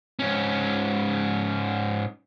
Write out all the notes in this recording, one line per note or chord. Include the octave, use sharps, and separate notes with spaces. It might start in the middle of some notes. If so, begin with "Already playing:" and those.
G#2 C#4